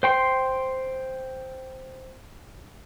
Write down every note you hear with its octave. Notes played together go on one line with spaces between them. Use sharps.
C5 G5 C6